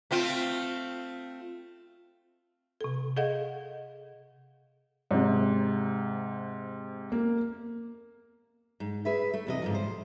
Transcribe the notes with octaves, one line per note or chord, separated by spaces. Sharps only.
A3 C4 F4
C3 A4
G#4 A4 D#5 F5 F#5
G#2 C3
A#3
G#2
G#4 B4 E5
A3
E2 C3 D#5
G#2 D3 F3
C5